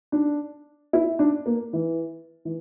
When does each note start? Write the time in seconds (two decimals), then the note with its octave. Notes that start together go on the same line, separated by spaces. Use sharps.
0.12 D4
0.93 E4
1.19 D4
1.46 A#3
1.73 E3
2.45 E3